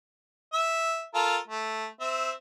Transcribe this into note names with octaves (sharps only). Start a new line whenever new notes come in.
E5
F4 A4 A#4
A3
C4 E5